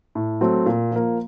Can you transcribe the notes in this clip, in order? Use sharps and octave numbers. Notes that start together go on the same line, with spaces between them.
A2
F#3 A3 C4
A#2
F3 A#3